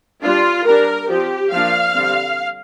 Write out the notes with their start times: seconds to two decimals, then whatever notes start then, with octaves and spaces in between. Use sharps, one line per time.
0.22 G3 D4 F4
0.65 G3 D4 A#4
1.09 F3 C4 G4
1.52 F3 A#3 D4 F5
1.95 D3 G3 C4